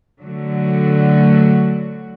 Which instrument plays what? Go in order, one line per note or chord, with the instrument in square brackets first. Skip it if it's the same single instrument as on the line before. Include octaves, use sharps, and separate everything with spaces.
[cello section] D3 F#3 A3 F#4